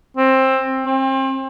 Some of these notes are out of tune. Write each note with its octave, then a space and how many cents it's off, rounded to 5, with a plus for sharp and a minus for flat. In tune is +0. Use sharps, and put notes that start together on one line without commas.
C4 +15
C4 +35